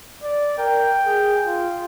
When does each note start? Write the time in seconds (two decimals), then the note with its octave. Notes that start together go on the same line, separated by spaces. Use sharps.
0.23 D5
0.58 A#4 G5
1.06 G#4
1.46 F4